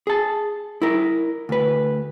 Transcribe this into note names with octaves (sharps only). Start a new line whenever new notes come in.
G#4 A5
E4 A#4
D2 B4